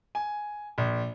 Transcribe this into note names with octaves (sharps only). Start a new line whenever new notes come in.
G#5
A#1